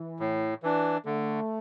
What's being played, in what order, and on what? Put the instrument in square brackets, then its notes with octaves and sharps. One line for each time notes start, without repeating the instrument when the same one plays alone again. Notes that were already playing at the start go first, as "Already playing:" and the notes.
Already playing: [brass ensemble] E3
[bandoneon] A2
E3 D4
[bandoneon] D3 [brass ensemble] A3